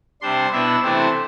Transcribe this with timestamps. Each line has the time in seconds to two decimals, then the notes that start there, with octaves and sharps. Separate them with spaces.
0.21 C3 G3 D4 C5 C6
0.52 B2 B3 D4 E4 E5
0.82 C3 E3 A3 C4 D4 C5